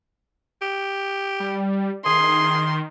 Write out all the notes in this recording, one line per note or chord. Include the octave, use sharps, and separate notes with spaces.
G4
G3
D#3 G#4 C6